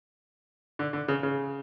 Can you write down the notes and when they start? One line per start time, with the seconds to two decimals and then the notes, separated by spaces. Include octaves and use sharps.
0.79 D3
0.93 D3
1.08 C#3
1.23 C#3